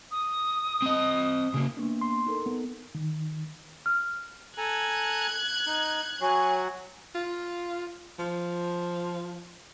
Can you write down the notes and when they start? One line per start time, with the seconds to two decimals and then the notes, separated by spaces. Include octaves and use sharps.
0.11 D#6
0.82 C4 D#5
1.54 C#3 A#3
1.77 A#3 B3 D4
2.01 C6
2.26 D#4 A4 A#4
2.46 B3
2.95 D#3
3.86 F6
4.58 A4 G#5 A#5 F#6 G#6
5.67 D#4
6.22 F#3 F#4 C#5 G#5
7.15 F4
8.19 F3